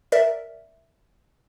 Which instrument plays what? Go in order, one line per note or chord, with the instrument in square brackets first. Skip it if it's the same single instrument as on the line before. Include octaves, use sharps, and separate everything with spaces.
[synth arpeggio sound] A#4 D5 E5